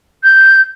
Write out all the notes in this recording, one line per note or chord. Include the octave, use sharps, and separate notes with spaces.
G6